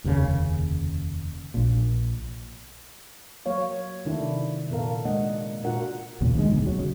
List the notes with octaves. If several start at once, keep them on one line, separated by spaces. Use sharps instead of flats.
F1 D#2 G#2 C#3
A#1 A#2
F#3 A#3 C#5 F5
C3 D#3 A3 D4 E4
A#2 B3 A4 A#4 F5
G#3 A#3 D4 D#5 F#5
A#2 D4 F4 F#4 A#4 F#5
B1 E2 A#2 C#3
D3 D#3 G#3
D1 G1 D#2 B2
D1 F#3
C#3